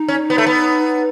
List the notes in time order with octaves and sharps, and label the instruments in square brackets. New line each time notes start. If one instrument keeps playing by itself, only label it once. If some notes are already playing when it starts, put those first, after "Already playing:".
Already playing: [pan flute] D#4
[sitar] C#4
B3
A3
B3